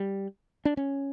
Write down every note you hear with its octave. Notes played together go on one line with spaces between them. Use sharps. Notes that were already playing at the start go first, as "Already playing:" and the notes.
Already playing: G3
D4
C#4